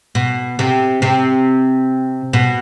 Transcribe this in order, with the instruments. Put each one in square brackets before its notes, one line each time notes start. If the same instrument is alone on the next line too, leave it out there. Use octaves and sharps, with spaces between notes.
[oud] B2
C3
C3
B2